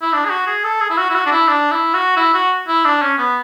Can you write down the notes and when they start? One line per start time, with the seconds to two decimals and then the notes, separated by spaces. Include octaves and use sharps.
0.02 E4
0.13 D4
0.25 G#4
0.30 F#4
0.47 G#4
0.64 A4
0.80 G#4
0.90 E4
0.98 F#4
1.10 E4
1.15 F#4
1.26 D4
1.31 E4
1.48 D4
1.71 E4
1.94 F#4
2.16 E4
2.33 F#4
2.68 E4
2.85 D4
3.02 C#4
3.18 B3